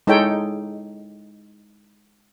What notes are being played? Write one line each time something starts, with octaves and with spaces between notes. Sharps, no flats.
G#3 D#4 E4 A4 C#5 G5